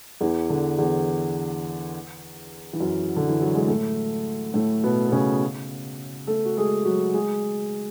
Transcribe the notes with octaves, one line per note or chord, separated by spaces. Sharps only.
E2 E3
D3
E2 E3
E3
F#2 F#3
D3
E3
F#3
G#3
A2 A3
A2 A3
B2 B3
B3
C#3 C#4
A3 A4
F#4
G#3 G#4
F#3 F#4
G#3 G#4